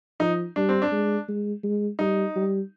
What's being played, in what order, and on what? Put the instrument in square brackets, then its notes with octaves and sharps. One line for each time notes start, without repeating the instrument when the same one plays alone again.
[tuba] F3 [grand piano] D#4
[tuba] G3 [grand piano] D4
[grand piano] C4
D4
[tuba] G#3
G#3
G#3
[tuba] G3 [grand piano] D#4
[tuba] G3